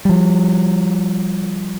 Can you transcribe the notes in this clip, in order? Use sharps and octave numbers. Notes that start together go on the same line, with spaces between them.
F3 G3